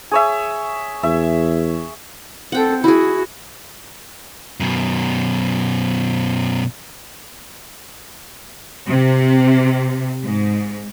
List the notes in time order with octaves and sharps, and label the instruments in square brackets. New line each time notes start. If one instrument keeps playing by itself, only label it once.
[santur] G#4 C#5 E5
[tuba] E2 [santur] E5
[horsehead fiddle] C4 A4 [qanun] F#5 G5
[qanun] E4 G#4 [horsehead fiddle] F#4
[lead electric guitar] F#2 B2
[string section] C3
G#2